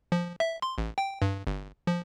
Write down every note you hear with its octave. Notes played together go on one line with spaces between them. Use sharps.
F3
E5
C6
A1
G5
G2
G1
F3